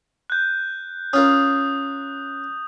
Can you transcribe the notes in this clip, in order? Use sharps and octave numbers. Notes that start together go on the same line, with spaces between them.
F#6 G6
C#4 F4 A#4 D#6